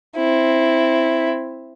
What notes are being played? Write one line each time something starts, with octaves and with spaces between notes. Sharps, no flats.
C4 E4